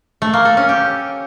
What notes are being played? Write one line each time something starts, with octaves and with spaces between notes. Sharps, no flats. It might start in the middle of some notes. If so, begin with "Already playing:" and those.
A3
A#3
A4
C#4
G4